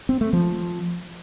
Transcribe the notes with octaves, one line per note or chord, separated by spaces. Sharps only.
C4
A3
F3